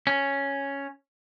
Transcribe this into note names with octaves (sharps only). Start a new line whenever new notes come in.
C#4